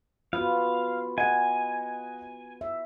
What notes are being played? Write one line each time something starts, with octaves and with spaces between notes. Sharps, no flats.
B3 F4 F#4 F5
D#5 F#5 G#5
E5